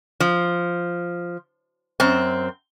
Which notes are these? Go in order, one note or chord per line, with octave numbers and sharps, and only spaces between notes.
F3
F#2 C4